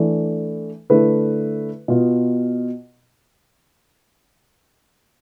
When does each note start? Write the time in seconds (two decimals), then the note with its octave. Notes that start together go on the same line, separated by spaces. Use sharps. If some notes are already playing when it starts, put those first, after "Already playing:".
Already playing: E3 A3 D4
0.90 D3 A3 E4 B4
1.88 B2 B3 F4